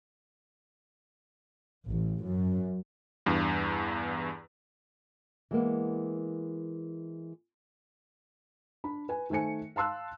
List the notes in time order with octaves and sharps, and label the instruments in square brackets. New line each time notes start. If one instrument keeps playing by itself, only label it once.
[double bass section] A1
F#2
[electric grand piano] E2 G2
[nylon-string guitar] E3 G#3 A#3 B3
[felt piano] D4 B5
B4 G#5
D#3 A3 C5 G#5 C#7
F5 A5 C6 E6 F#6